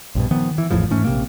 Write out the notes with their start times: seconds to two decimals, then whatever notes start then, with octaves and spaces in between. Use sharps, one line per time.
0.15 A#1 G2 B2
0.31 D#3 F3 B3
0.58 E3
0.71 G#1 E2 A2 F3
0.90 G#2 E3 A3 C#4
1.04 A#1 C3 A#3